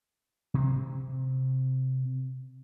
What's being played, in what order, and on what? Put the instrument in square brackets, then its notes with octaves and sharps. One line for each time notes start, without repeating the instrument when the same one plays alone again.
[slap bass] C3 C4